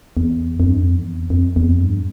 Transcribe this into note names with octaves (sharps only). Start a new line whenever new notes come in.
E2
F2
G2
F2
E2
F2
E2
F2
G2